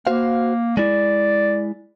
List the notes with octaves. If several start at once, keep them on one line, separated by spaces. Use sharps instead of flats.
A#3 F#4 C5 F5
G#3 E4 D5